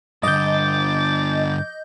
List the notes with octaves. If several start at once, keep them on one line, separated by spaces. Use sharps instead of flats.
G2 D3 D#5 D6 G6 A6